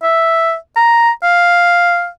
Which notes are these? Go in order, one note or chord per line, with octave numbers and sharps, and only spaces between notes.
E5
A#5
F5